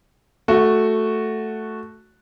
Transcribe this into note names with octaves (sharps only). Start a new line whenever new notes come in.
A3 F#4